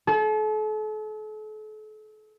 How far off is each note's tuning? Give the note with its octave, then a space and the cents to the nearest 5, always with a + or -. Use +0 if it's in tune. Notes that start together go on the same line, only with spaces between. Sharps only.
A4 -40